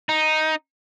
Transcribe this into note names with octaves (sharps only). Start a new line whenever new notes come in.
D#4